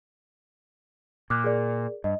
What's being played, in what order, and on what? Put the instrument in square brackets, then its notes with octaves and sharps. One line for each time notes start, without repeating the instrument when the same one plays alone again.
[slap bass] A#2 [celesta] D6 F6 F#6
[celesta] G#4 A#4 D5
[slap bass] G2 [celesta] D#5